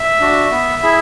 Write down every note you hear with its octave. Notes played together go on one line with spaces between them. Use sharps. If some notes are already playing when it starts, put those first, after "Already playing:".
Already playing: E5
D4 F#4
B3
E4 G#4